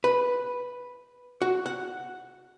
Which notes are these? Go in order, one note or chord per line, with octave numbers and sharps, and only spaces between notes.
B4
F#4
F#5